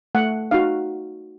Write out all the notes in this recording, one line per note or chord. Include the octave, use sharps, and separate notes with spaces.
A3 F#5
D#4 F#4 F5